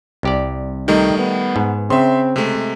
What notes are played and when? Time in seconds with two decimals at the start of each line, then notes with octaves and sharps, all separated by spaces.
0.23 C2 G4 D5
0.88 D#3 G3 A3 D#4
1.19 B3
1.56 G#2
1.90 C#3 C4 E5 C6
2.36 C3 G#3 A3